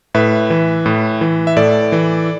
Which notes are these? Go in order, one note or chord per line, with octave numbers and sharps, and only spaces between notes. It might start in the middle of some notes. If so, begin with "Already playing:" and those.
A2 B4 E5
E3
A2
E3
E5
A2 A4 D5
E3